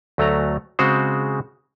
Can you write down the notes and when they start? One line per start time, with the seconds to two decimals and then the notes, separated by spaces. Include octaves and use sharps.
0.18 D2 F#3 A3 F#4 A#5
0.79 C#3 G#3 C4 F#4 C5